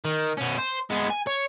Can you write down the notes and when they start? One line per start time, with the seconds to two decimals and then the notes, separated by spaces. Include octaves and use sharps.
0.05 D#3
0.37 B2 C#4
0.58 C5
0.90 G#3 B3
1.11 G#5
1.27 C#5